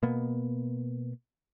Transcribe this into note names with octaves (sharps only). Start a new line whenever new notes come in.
B2 A#3 B3